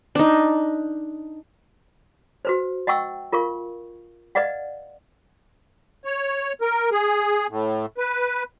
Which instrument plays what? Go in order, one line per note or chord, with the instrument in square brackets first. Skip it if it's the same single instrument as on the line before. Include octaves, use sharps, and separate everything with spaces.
[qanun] D4 D#4
[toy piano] F#4 B4 C5
D#5 F#5 G5 C#6 E6
F4 A#4 F5 C#6
B4 D5 D#5 F5 F#5
[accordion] C#5
A#4
G#4
A2
B4